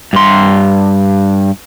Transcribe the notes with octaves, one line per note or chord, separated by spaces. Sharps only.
G2 C6